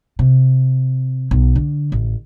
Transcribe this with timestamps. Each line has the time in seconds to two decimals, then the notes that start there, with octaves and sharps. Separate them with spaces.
0.19 C3
1.31 B1
1.55 D3
1.92 A1